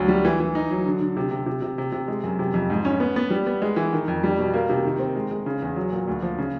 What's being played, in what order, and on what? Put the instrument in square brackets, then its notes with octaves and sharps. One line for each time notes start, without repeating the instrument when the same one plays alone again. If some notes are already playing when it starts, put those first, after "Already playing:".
Already playing: [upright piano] D2 F#3
G3
E3
E3
D#4
F#3
D3
D3
C3
C3
C3
C3
C3
C3
G#3
F#2
C3
F2
G#2
C#4
B3
B3
G3
B3
G#3
E3
D#3
F2
G3
B2
A#3
C3
D#3
C4
G#3
G#3
C#3
E2
F#3
A#2
D2
F3
C#3